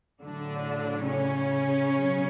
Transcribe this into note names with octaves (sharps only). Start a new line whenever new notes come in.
A2 D3 F#3 D4
C#3 C#4
B2 F#3